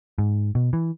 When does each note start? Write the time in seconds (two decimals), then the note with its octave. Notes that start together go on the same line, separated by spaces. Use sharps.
0.18 G#2
0.55 B2
0.73 E3